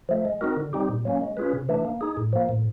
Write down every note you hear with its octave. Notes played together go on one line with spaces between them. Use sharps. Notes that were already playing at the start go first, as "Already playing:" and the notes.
F3 A3
G#3
C4 D#4 F#4 A#4
D3
G3 C4 D#4 G4
A#2
F#3 A#3 C#4
G#3
C#4 F4 G#4 B4
C3
E3 A3 D4
A#3
D#4 G#4
A2
F3 A#3
A2